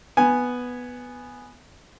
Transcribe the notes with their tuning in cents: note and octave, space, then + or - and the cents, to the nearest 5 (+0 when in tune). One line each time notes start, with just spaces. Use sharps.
B3 +0 G#5 +0